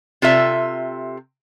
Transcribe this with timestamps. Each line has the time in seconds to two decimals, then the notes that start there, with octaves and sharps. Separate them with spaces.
0.22 C3 F4 A4 E5